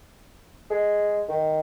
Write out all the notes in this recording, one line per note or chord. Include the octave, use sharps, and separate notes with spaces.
G#3
D#3